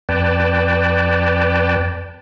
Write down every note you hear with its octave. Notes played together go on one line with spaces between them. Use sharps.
F2 B4 D5 G5 A5